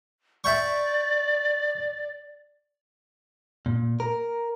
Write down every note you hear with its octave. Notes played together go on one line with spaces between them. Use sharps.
D5 E5 G5 C#6
A#2
A#4